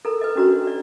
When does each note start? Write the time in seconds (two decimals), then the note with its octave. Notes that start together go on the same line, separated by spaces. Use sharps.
0.05 A4 A#4 A#5
0.21 B4 D#5
0.36 C#4 D4 F#4 C#5 A#5
0.67 D5